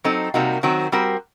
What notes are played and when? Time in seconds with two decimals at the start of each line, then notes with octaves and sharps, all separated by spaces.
0.04 F#3 C4 D#4 A4
0.34 C3 G3 A#3 D#4 F#4
0.63 D#3 F#3 C4 F#4
0.92 G3 C4 F#4 A#4